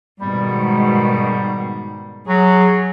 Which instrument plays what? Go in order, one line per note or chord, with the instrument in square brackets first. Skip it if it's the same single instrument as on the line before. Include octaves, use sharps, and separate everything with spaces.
[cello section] G#2 B2 D#3 [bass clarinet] G3
[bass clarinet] F#3 [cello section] G#4